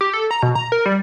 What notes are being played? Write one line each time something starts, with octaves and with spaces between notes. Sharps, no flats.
G4
A4
A#5
B2
A#5
A#4
G3